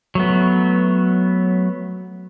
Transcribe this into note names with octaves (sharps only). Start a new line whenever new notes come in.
F#3 A3 B3